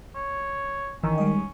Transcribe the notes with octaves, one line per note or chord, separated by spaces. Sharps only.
C#5
A1 D#3 E3 C#4 E6
G3 G#3 D#5